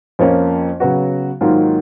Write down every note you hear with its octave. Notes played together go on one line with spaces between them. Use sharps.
F2 F3 A#3 C#4
C#3 F#3 B3 F#4
G#2 D#3 F#3 A#3 F4